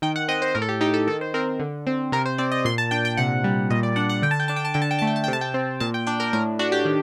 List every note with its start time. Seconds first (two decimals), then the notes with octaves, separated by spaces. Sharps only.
0.02 D#3 G5
0.16 F#5
0.28 C4 D#5
0.42 C5
0.55 A2 A#4
0.62 A4
0.69 G4
0.81 D#4 G4
0.94 A4
1.07 D#3 A4
1.21 C5
1.34 C4 A#4
1.60 D3
1.87 C4
2.12 C3 A#4
2.26 C5
2.38 C4 D5
2.52 D#5
2.65 A#2 C6
2.78 A5
2.91 D4 G5
3.05 G5
3.17 C3 F#5
3.44 G3
3.70 A#2 D#5
3.83 D5
3.96 D4 F#5
4.09 F#5
4.22 D3 G5
4.31 A5
4.40 G5
4.48 D4 A5
4.56 G5
4.65 A5
4.74 D3 G5
4.82 A5
4.91 G5
4.99 A3 A5
5.07 G5
5.16 A5
5.24 G5
5.28 C3 A5
5.41 G5
5.54 C4
5.80 A#2 A5
5.94 G5
6.07 D4 G5
6.20 A#4
6.33 A2 A#4
6.59 D4 F#4
6.72 G4
6.85 D#3